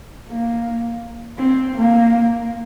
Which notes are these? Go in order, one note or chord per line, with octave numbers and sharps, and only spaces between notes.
A#3
C4
A#3